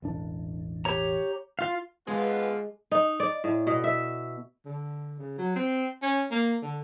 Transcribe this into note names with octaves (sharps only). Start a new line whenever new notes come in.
E1 A1 D4
G4 C#5 A#5
F4 F5
G#2 D3 G#3 B3 F4 G#4
D#4
D5
A2
B2
E5
D3
C#3
F#3
C4
C#4
A#3
D3